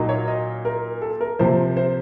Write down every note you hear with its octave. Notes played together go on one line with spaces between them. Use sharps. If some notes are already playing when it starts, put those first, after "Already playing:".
Already playing: A#2 F#3 A#3 D#4
C#5
D#5
A#4
A4
A#4
C3 F3 A#3 C5
C5